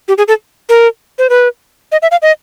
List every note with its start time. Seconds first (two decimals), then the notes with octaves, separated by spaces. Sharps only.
0.08 G4
0.18 G#4
0.28 A4
0.69 A#4
1.19 C5
1.30 B4
1.92 D#5
2.02 E5
2.11 F5
2.22 D#5